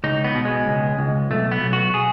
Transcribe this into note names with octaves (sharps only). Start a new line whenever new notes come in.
C#2 D#4
B3
B2
G#3
C#2
C#2
B1 A3
B3
B1
F#4
G#4